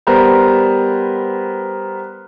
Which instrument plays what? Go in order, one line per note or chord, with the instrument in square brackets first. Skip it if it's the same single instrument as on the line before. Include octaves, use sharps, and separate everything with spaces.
[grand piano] G3 B3 A#4 C5